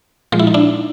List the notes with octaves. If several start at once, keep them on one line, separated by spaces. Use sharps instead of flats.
A#2 F3 G#3 F4
E4
D#4
D4 E4